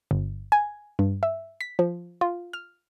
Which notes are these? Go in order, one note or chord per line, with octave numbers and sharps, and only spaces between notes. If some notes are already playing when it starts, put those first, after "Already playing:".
G1
G#5
G2
E5
B6
F3
F4
F6